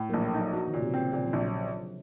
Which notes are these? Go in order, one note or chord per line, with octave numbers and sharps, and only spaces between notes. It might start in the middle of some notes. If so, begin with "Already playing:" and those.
Already playing: A2
F#3 A#3
A#1
A3
F#3 D#4
F3 F#3
D#3
A#2 C#3
C3
C#3 C4
A#2 C#3
F3
A#1
F#3